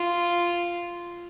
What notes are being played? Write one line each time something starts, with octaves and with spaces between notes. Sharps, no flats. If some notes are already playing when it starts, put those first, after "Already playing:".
Already playing: F4